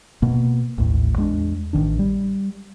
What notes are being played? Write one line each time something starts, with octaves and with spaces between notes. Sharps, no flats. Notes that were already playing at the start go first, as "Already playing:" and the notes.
B2 A#3
A1 D#2 A2
E2 G#3 D4
A1 D#3 D4
G3